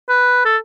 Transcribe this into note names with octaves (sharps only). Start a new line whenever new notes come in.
B4
A4